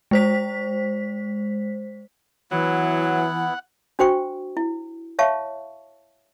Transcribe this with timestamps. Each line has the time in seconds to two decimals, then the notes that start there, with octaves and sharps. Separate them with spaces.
0.11 G#3 C5 B6
2.51 E3 F#3 B3 E4 F#5
3.99 D4 F#4 C5 G5 C#6
4.57 E4
5.19 C#5 E5 F5 A5 C#6